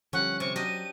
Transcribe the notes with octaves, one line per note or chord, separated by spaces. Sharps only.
D3 F3 G3 C#4 F#5
C3 C#6
F#3 D4 G4 D#5 D#7